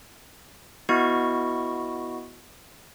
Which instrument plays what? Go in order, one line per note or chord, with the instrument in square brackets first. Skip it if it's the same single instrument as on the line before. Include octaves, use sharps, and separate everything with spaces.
[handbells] B3 E4 F#4 D#5 C#6